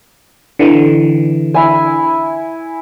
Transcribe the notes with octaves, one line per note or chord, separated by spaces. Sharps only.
D3 E3
E4 G#5